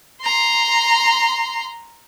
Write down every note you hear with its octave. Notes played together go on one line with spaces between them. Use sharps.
A#5 C6